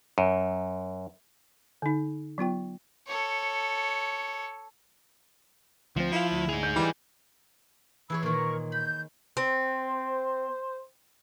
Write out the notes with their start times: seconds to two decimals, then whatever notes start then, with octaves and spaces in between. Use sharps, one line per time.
0.18 F#2
1.82 D3 D#4
2.38 F#3 B3 F4 G5
3.07 A4 C#5
5.96 D2 F3 C4
6.12 E4 F4 F5
6.32 D2
6.49 D#4 G#4 F7
6.63 G6
6.76 E3 G3
8.10 E3 G#4 C#5 B5 E6
8.23 A#2 D#3 A#4 C#6
8.72 B5 G6
9.37 C4 C5